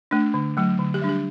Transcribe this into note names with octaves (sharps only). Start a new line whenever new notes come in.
A3 D4
D3
F#3 A3
D3
G4
G3 D4
G4